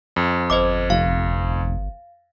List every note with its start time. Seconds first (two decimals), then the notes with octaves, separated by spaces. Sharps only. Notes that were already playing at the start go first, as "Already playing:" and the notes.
0.16 F2
0.50 G1 C5 D#5 D6
0.90 F1 F5